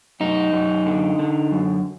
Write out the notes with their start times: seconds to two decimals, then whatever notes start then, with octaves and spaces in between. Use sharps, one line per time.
0.20 F#2 D#4
0.53 F#2
0.86 D3
1.19 D3
1.52 F#2